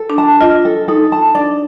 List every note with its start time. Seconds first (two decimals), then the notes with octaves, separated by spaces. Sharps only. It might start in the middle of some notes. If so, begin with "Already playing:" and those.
Already playing: A4
0.10 D4
0.18 A5
0.41 F4 D#5
0.65 A4
0.88 D#4 A4
1.12 A5
1.35 D4 D5